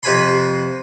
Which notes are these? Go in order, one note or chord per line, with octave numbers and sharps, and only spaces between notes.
F2 C3 B4 G#5 B5 C6